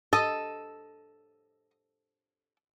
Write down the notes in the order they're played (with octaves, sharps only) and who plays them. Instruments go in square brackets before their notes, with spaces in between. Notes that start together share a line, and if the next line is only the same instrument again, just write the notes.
[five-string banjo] A4 [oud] D#5